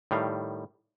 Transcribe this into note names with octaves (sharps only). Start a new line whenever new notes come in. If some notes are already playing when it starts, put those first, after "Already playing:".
A2 D#3 G3 F5